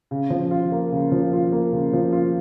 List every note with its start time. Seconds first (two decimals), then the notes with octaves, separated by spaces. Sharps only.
0.11 C#3
0.30 F3
0.51 F4
0.72 A#3
0.92 C#3
1.12 F3
1.33 F4
1.52 A#3
1.72 C#3
1.93 F3
2.12 F4